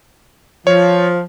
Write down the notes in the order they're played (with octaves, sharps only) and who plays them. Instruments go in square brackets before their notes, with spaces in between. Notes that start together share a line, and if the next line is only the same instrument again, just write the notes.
[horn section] F3 [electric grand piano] C#5